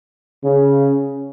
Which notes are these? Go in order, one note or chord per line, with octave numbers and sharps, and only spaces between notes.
C#3